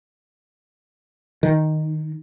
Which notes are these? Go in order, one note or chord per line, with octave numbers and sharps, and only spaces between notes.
D#3